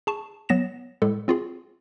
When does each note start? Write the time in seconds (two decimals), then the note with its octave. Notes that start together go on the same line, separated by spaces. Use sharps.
0.07 G#4 A5 C#6
0.49 F#3 B3 A#6 E7
1.02 A2 G#3 A4
1.28 C4 F4 F#4 G#4